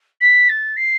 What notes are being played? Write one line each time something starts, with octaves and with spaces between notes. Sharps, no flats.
B6
A6
C7